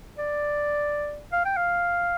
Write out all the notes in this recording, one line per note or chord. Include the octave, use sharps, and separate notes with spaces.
D5
F5
G5
F5